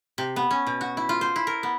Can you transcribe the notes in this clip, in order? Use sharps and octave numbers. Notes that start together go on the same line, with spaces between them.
C3
B3
C#4
B2
F#4
E4
F4
C5
E4
A#4
B3